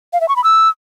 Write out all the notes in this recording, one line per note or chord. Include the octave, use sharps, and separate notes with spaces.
F5
E5
C#6
B5
E6